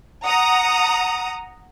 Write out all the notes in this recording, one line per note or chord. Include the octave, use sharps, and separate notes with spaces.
F#5 A#5 D#6